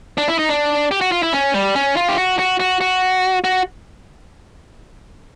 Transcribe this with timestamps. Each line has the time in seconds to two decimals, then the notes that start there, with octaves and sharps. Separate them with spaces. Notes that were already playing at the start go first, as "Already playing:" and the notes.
0.18 D4
0.28 E4
0.39 D#4
0.49 D4
0.91 G4
1.01 F#4
1.12 F4
1.23 E4
1.33 C#4
1.54 G3
1.76 C#4
1.97 F4
2.09 G4
2.18 F#4
2.39 F#4
2.60 F#4
2.81 F#4
3.44 F#4